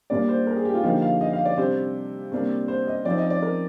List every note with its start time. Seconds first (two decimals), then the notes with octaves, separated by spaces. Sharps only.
0.10 A#2 G3 A#3 D4 D5
0.29 C5
0.47 A#4
0.56 G#4
0.65 G4
0.74 F4
0.84 D3 F3 A#3 D#4 G4
1.02 F5
1.21 D#5
1.33 F5
1.45 D5
1.58 C3 G3 D4 C5
2.32 C3 G3 A#3 D4
2.68 C5
2.87 D#5
3.05 F3 C4 D#4 D5
3.18 D#5
3.30 D5
3.42 A#4